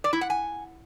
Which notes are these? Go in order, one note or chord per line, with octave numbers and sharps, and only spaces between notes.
D5
E4
F#5
G#5